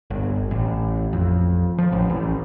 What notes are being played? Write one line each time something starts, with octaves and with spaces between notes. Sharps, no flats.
G1
A1
F2
F3
A1
A1